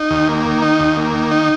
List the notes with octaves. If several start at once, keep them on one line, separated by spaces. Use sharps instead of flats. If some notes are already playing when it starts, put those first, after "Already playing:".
Already playing: D#4
D#2
A#3
D#3
D#4
D#2
A#3
D#3
D#4